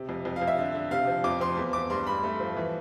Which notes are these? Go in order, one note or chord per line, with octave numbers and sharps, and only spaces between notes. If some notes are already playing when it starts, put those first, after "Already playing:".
Already playing: C3
F2
F2
F5
F2
E5
D3
D3
C3 F5
F3
F2 D6
F3 C6
E2
E2 D6
G2 C6
G2 B5
A3
F3
E3